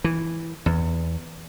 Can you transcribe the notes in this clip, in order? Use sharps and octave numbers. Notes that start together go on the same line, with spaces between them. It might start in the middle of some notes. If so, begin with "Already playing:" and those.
E3
E2